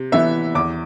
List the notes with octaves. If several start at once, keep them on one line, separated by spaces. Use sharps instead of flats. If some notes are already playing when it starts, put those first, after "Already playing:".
Already playing: C3
E3 B3 E5
E2 D6